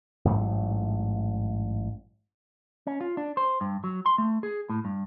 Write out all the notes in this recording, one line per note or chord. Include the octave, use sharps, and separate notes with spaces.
A1 G#2 F#3 A3
C#4
F4
D4
C5
G2
F#3
C6
A3
G#4
A2
G2